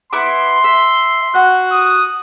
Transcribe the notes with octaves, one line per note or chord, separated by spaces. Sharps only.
B3 E4 C6 D6
E5
F#4 F#5
D#6